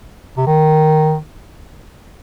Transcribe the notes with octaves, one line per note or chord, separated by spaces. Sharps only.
C3
D#3